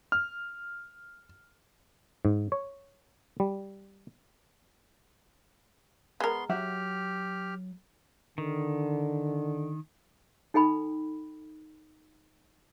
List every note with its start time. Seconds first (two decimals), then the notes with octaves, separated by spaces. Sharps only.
0.12 F6
2.25 G#2
2.52 C#5
3.40 G3
6.20 G#3 B3 A#4 C6
6.49 F#3 G4 E5 F#5 F6
8.38 D3 D#3
10.54 D#4 A4 G5 B5